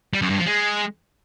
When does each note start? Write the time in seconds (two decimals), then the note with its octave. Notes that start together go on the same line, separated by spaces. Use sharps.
0.13 G3
0.22 F#2
0.30 G2
0.38 F3
0.46 G#3